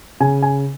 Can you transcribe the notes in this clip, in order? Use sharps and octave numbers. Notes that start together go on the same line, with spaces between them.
C#3 G#5
G#5